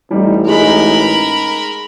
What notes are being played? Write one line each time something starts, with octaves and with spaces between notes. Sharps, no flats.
A1 G3 D#4
G#3 D#4 G#4 A#4 B5